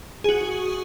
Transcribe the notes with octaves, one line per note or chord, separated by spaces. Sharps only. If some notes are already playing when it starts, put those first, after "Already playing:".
F#4 G#4